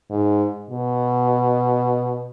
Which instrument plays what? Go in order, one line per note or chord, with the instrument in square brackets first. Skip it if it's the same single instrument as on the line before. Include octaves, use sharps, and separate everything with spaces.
[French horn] G#2
B2